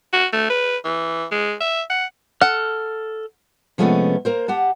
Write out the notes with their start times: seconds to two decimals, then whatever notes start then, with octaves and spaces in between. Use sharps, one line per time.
0.13 F#4
0.33 A3
0.50 B4
0.85 E3
1.31 G#3
1.61 E5
1.90 F#5
2.41 A4 F#5 F6
3.78 C3 F3 G#3 A3 B3 C#4
4.25 A#3 A#4 C5
4.48 G4 F#5 A5